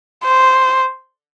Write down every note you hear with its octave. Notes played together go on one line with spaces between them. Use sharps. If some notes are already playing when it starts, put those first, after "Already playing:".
C5